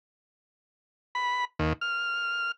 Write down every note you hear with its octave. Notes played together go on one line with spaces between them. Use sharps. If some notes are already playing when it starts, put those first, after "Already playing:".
B5
D#2
F6